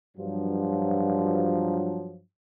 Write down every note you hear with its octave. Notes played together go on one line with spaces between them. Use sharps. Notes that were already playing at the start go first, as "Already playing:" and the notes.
G2 F3 F#3